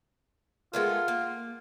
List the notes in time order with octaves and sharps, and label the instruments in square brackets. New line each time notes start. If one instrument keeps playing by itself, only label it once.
[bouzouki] G#3 A3 B3 [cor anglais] F4 [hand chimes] A#4 F#5
[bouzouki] A#3